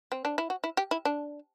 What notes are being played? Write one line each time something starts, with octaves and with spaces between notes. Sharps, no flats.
C4
D4
E4
F#4
E4
G4
E4
D4